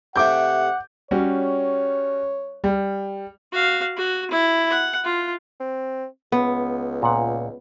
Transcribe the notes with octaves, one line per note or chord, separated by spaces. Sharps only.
C3 A3 F#5 D6 G6
G3 C#4 F#4 C#5
G3
F#4 F5
F#4
E4
F#5
F4
C4
C#2 B3
A#2 F#5